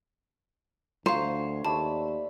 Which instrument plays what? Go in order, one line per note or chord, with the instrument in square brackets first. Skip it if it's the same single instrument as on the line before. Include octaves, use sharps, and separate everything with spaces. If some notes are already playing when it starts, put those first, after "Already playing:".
[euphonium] D2 [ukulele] C5 [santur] C#5 [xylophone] F5 A#5
[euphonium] D#2 [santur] A3 D5 B5 [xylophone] A5